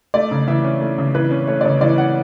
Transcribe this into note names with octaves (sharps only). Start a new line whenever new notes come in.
A3 D5
C#3
E3 E5
C#4
A3
C#3
E3 B4
C#4
A3 C#5
D5
C#3 C#5
E3 D5
C#4 F#5